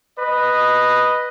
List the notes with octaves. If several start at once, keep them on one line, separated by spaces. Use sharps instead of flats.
B4 D#5